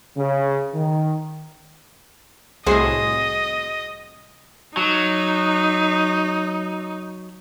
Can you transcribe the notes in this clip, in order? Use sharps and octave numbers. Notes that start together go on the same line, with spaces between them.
C#3
D#3
C2 A2 F#4 G#4 C5 D#5
F#3 D#4